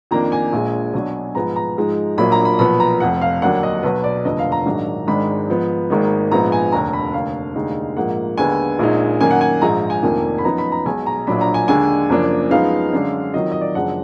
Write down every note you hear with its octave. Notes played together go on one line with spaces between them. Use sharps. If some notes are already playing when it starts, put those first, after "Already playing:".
F2 D#3 A#3 D4 A#5
G#5
A#1 A#2 G#3
B1 B2 F#3 D4
G#2 F3 B3 A#5
A#5
G#2 F3 G#3 D#4
A#1 A#2 F#3 A#3 D4 B5
A#5
B5
B1 A#2 F3 B3 B5
A#5
F1 F2 F3 F#5
F5
D#2 D3 F#3 A#3 D4 F#5
D#5
B1 B2 F#3 B4
D5
F1 D#2 D3 F3 B3 D#5
F5
A#5
A#1 G#2 D#3 F#3 D4
G#1 G#2 D#3 G#3 D4 B5
G#2 F3 B3
G#1 G#2 D#3 A#3 D#4
A#1 G#2 F3 B3 A#5
G#5
F1 D#2 D3 A#5
B5
F1 D#2 D3 F5
F1 D#2 D3 G#3 D#4
A#1 G#2 F3 A#3 F#5
D#2 D3 G#3 B3 G#5
A#1 A#2 G#3 D#4
F#2 D#3 A#3 G#5
F#5
G#5
A#1 G#2 F3 G#3 A#5
G#5
F1 F2 D#3 A#3 D4
B5
F#2 F3 B3 D#4 A#5
B5
A#5
B1 B2 G#3 G#5
A#5
A#1 A#2 F#3 D4 B5
A#5
G#5
D#2 D3 G#3 D4 G#5
F#1 F#2 F3 A#3 D4
F#2 F3 G#3 B3 D#4 F5
F#2 D3 G#3 D4
F2 D#3 F#3 D#5
D#5
D5
F#1 F#2 F3 G#3 D4 F#5